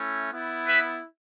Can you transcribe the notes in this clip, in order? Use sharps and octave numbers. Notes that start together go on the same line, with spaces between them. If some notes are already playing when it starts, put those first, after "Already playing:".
Already playing: A3 C#4 E4
B3 E4
B4 E5